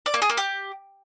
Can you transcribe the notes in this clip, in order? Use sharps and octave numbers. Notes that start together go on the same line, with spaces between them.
D5
A#3
G#4
A#3
G4